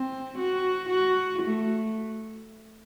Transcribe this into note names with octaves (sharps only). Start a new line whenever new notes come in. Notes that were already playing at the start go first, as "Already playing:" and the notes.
Already playing: C4
F#4
F#4
A3